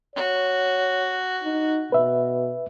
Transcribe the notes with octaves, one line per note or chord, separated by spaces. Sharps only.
F#4 C#5
D#4
B2 B4 E5